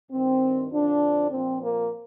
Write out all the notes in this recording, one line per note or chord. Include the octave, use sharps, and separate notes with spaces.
G2 D#3 C4
F2 D3 F3 D4
A#2 F3 C4
A#3